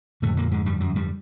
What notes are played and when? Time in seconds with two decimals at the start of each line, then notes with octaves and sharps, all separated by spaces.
0.22 F2 A2 D3 A3
0.37 A#2 A#3
0.51 G#2 G#3
0.66 G2 G3
0.80 F#2 F#3
0.95 G2 G3